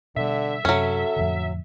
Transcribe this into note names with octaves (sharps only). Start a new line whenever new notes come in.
B2 D3 G3 E5
F#2 C3 F#3 C#4 A4
F2 A2 D3